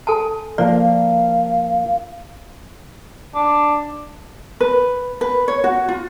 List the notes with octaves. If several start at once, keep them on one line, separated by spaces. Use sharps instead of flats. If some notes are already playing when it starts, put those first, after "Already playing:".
A4 G#5 A5
F3 A#3 A#4 D5 F5
D4
B4
B4
C#5
F#4
F4